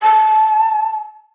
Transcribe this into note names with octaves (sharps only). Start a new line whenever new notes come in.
A5